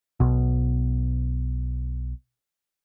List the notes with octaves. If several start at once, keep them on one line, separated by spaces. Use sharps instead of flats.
B1 B2